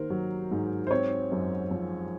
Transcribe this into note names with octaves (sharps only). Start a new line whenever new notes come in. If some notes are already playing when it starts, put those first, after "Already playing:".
Already playing: D#3 A#3 A#4 C5
F#3
G#2
C5
C4 C#5
F#2
F3